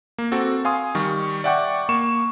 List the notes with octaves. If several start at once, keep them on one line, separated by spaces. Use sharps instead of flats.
A#3
C4 F#4 A4
F5 G#5 C6 D#6
D#3 G3 C#6
D5 E5 F#5 G5 C#6 D6
A#3 C#6 E7